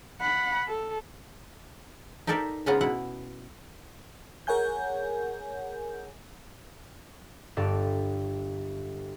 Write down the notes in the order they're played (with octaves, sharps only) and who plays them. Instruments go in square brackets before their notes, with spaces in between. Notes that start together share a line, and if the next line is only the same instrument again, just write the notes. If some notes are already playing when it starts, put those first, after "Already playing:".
[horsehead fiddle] F#5 B5
A4
[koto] D#4 G4 A4 A#4 D5 E5
C#3 B3 C#4 F4 F#5 A#5
B2 E4 F#5
[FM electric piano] G#4 A#4 C#5 F#5 G#5 G6
[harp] G1 G2 A4 A#4 D5 G5